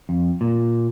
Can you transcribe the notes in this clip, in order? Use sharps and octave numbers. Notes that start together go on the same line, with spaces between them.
F2
A#2